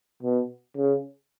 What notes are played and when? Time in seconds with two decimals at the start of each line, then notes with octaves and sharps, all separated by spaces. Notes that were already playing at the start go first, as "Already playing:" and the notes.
0.23 B2
0.77 C#3